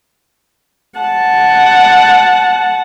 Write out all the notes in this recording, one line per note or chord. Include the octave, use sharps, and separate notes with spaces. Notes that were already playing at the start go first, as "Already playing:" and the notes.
F#5 A5